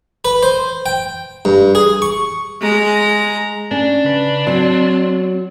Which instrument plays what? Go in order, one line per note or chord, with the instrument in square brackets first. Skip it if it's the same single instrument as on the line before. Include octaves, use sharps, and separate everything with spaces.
[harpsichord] B4
C5
G5
G2
G#4
C#6
[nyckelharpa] G#3 A#5
[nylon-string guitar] C#4 [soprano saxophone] D4
[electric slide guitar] C#3 B4
[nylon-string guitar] F#3 [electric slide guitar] C4